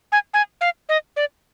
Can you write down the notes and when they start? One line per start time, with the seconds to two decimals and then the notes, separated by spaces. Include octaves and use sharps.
0.12 G#5
0.34 G#5
0.61 F5
0.89 D#5
1.16 D5